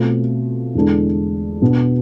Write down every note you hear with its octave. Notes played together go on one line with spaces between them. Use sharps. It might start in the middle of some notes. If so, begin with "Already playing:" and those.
Already playing: B2 A3 C4 F4
E2 D3 G#3 D4 A4
B2 B3 D4